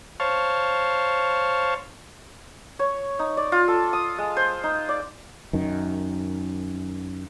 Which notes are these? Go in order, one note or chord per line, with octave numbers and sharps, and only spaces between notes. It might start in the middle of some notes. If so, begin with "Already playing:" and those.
C5 C#5 F5 A5
C#5
D#4
D5
F4
A4
D#6
G#3
C5
D#4
D5
F#2 D#3